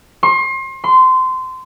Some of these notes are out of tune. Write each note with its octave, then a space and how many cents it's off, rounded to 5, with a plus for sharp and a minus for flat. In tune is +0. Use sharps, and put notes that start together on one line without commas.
C6 +35
C6 -20